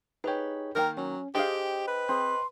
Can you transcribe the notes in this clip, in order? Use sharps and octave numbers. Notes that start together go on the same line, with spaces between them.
D#4 G4 G#4 B4 C#5
D#3 A#3 A#4 G5
F#3 C#4
D4 G4 G#4 C5 D#5 F5 G5
B4
C4 G#4 C6